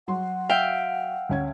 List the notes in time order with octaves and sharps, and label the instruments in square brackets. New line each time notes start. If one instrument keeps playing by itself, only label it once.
[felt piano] F#3 C6 [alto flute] F#5
[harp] E5 F5 G5
[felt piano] D2 C#4 G#6